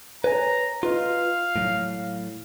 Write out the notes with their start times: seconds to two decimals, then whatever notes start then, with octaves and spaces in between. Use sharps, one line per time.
0.24 B4 C#5 G#5 A#5
0.83 F4 B4 D#5 F5
1.56 A2 F#3